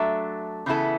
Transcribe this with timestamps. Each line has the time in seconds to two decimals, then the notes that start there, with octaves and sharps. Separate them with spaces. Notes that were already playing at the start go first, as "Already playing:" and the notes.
Already playing: F#3 A3 D4 A4 E5
0.66 C#3 E3 B3 E4 A4